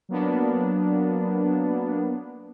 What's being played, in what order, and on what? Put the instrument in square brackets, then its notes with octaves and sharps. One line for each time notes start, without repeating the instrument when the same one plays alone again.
[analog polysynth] F#3 A#3 B3 D4